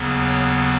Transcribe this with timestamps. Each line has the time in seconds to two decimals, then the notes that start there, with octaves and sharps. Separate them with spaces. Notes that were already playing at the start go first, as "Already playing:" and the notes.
Already playing: D#2 C#3 F#3 B3
0.26 C#5